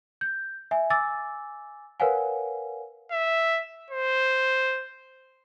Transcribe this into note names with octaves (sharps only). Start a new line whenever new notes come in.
G6
E5 G#5
G#5 D6 E6 A6
A#4 B4 C#5 F5 F#5 G#5
E5
C5